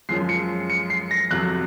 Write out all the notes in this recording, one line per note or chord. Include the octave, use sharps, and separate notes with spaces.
F#2 F3 G#3 C7
C#7
C#7
C7
A#6
F2 C3 F#3 F#6